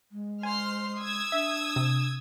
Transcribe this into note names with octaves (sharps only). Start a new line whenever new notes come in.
G#3
C5 G#5 C6 F6
D#6 E6 G#6
D4 E5
C3